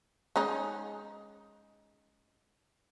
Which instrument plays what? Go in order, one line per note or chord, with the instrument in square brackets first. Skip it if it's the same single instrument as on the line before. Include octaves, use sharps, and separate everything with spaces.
[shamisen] G#3 C#4 D#4